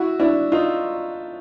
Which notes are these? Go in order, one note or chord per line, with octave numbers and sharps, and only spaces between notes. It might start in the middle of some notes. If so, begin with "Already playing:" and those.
Already playing: E4 F#4
D4 E4
D#4 F4